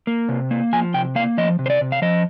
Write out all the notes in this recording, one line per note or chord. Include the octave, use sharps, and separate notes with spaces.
A#3
C3
A#3
F3 G#5
C3 G5
A#3 F5
F3 D#5
C3
C5
D5
C3
F5
F3 D#5